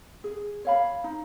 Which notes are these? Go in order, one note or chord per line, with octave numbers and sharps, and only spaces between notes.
G#4
C#5 F5 B5
D#4